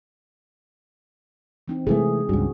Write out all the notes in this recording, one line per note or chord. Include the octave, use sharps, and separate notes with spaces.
E3 C4 D#4
C3 E3 G#3 A3 G#4
C#2 G2 F#4